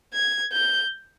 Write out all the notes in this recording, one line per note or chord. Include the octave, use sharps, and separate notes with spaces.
G#6
G6